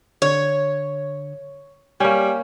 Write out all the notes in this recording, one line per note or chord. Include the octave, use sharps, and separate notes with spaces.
D3 C#5 G#6
G3 A#3 C#4 G5 G#5 G#6